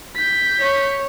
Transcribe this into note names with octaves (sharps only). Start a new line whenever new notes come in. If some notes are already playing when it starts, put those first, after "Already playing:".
G6 B6
C#5